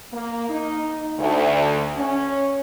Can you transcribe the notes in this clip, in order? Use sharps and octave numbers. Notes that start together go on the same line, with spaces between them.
A#3
D#4
D2
C#4